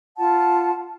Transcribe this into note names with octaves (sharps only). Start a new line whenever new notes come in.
F4 F#5 A5